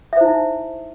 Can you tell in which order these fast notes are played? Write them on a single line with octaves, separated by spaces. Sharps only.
E5 C5 E4 D#4